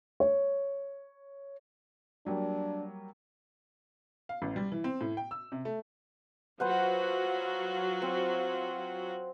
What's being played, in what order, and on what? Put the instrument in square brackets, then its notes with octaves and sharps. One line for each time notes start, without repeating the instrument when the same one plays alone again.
[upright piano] C#5
[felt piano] F#3 G3 A#3 [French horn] D4
[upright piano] F5
A1
G3
E3
C4
A2
G5
E6
C3
A3
[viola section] F#3 F4 F#4 [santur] B4 C5 F#5
[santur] C4